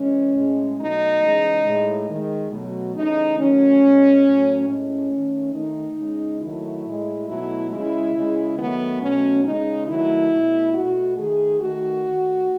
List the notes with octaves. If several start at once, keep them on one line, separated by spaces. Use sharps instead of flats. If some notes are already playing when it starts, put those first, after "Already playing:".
Already playing: C#3 E3 G#3 C#4
A2 G#3
B2 F#3 A3 D#4
C#3 E3 G#3
A2 G#3
D#3 G#3
B2 F#3 A3
C#3 E3 A3 D#4
D#3 F#3 A3 C#4
B2 G#3
A2 F#3 A3
A2 G#3 C#4
D#3 A3
D#3 A3 D#4
C#3 G#3
D#3 F#3 A3 E4
A2 G#3
B2 F#3 A3 E4
C#3 G#3 E4
C#3 G#3
D#3 F#3 A3 B3
B2 F#3 A3 C#4
C#3 G#3 D#4
D#3 F#3 A3 E4
B2 A3
B2 A3 F#4
D#3 A3 G#4
D#3 A3 F#4
D#3 A3